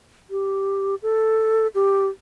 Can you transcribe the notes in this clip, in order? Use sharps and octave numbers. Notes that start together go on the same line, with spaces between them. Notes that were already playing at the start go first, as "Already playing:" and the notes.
G4
A4
G4